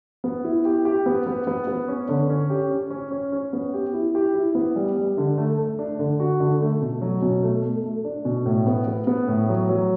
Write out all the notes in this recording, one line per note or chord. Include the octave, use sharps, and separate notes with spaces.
B3
E4
G4
G4
B3
B3
B3
B3
C#4
D3
C#4
G4
C#4
C#4
C#4
C#4
B3
G4
E4
G4
E4
B3
G3
G3
D3
A3
A3
D4
D3
F#4
D3
A3
B2
F#3
B2
A3
A3
A3
D4
B2
A2
B3
B3
B3
A2
F#3
F#3